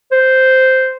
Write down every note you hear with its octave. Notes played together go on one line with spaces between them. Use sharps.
C5